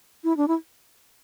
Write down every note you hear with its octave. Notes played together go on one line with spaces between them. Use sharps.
E4
D4
E4